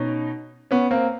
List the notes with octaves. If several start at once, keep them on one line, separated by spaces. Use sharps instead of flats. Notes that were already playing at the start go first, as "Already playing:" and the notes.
Already playing: B2 C#4 D#4
B3 C#4
A#3 C4